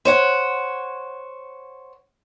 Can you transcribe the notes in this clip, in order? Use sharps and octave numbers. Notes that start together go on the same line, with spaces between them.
C5 C#5 F#5